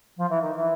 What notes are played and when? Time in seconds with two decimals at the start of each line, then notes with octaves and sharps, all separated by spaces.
0.17 F3
0.30 E3
0.42 D#3
0.56 E3